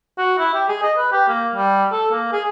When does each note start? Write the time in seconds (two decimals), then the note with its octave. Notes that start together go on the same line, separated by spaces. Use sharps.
0.18 F#4
0.38 E4
0.54 G4
0.68 G#4
0.82 D#5
0.97 B4
1.12 G4
1.28 A#3
1.55 G3
1.92 A4
2.11 A#3
2.32 G#4